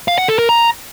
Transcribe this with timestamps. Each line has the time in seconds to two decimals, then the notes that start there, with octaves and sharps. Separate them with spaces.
0.08 F5
0.18 F#5
0.28 A4
0.39 A#4
0.49 A#5